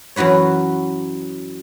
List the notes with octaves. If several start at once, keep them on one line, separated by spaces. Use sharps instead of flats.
F#2 E3 F#4 B4 C#5